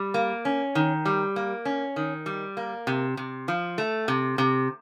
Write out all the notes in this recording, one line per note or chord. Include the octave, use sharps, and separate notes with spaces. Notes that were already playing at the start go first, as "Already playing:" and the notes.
Already playing: G3
A#3
C#4
D#3
G3
A#3
C#4
D#3
G3
A#3
C3
C3
F3
A3
C3
C3